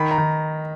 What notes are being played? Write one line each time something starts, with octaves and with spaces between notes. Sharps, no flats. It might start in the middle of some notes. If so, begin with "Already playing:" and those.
Already playing: D#3 B5
A#5
D#3